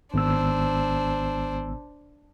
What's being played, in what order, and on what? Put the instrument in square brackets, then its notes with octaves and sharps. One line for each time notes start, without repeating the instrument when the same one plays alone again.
[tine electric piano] G#1 B3 E6 [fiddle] D4 C5